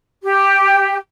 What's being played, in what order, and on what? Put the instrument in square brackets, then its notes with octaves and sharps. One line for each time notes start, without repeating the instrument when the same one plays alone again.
[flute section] G4